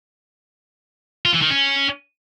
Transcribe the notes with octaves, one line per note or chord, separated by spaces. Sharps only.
F4
E3
D#3
C#4